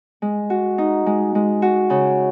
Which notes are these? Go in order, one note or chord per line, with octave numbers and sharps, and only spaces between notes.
G#3
F#4
D#4
G#3
G#3
F#4
C#3